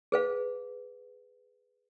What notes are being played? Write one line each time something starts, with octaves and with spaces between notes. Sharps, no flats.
G#4 B4 F5